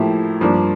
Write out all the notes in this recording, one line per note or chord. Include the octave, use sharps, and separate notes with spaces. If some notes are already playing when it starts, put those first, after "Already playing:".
Already playing: A2 F3 A#3 E4 G4
G2 F3 A#3 D4